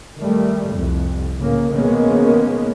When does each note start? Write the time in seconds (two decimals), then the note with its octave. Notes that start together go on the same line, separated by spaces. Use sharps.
0.18 D#3 G3 A3
0.71 C2 F2
1.38 A2 C#3 A#3
1.72 B2 D#3 G#3 A#3 B3 C#4